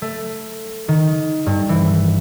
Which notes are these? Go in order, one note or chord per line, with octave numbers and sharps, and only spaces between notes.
A3
D#3
G2
E3